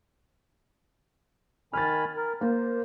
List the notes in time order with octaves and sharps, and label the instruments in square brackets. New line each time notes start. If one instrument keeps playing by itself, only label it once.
[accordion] D#3 G#5 B5 [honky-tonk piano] F6 A6
[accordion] A#4
[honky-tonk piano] A#3 [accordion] C5